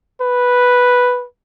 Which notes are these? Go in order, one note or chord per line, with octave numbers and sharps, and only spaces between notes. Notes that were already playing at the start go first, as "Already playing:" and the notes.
B4